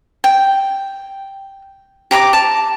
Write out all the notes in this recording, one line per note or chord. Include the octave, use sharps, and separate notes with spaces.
G5
G4 A#5 B5 D6
A5